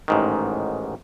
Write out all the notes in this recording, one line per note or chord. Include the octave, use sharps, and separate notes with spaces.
A1 G#2 D#3